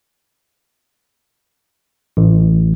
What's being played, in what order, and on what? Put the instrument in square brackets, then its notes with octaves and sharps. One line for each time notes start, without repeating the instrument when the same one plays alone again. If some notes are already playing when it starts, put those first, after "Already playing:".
[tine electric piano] A1